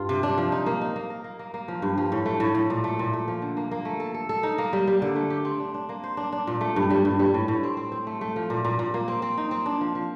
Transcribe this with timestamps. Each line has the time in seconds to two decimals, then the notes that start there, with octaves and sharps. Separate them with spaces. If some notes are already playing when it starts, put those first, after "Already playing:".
Already playing: G2 F4
0.09 C3
0.23 D4
0.38 F3
0.52 D#4
0.66 A#3
0.81 D#4
0.96 A#3
1.10 A#4
1.24 A#3
1.39 A#3
1.54 A#3
1.68 F3
1.82 G2
1.98 F3
2.12 A2
2.26 A3
2.40 A2
2.55 A2
2.70 A#2
2.84 A3
2.99 A#2
3.13 A3
3.28 F3
3.42 D3
3.57 A#3
3.71 A#3
3.85 A3
4.00 A4
4.14 A4
4.29 A4
4.43 D#4
4.58 A#3
4.73 G3
4.88 G3
5.02 D3
5.16 A3
5.30 G4
5.45 C4
5.60 D4
5.74 D4
5.89 A#3
6.04 C5
6.17 D4
6.32 D4
6.47 A#2
6.61 A3
6.76 G2
6.90 G3
7.05 G2
7.19 G3
7.34 A2
7.48 A2
7.63 C4
7.77 C4
7.92 C4
8.07 A3
8.21 A3
8.36 F3
8.50 A#2
8.65 A#2
8.79 A#2
8.94 A#3
9.08 C4
9.22 C4
9.38 D#4
9.51 C4
9.66 D4
9.81 F3
9.95 F3